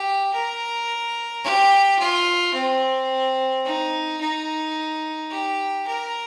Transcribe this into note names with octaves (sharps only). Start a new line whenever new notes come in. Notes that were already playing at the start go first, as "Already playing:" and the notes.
Already playing: G4
A#4
G4
F4
C4
D#4
D#4
G4
A#4